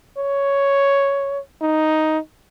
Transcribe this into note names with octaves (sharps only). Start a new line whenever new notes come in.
C#5
D#4